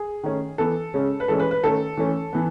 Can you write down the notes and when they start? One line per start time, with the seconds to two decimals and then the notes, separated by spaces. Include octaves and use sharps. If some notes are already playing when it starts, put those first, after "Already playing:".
Already playing: G#4
0.24 D#3 A3 C#4
0.58 E3 B3 A4
0.94 C#3 G#3 C#4
1.20 B4
1.28 E3 G#3 C#4 A4
1.40 B4
1.51 B4
1.64 D#3 A3 C#4 A4
1.97 E3 A3 C#4
2.33 E3 B3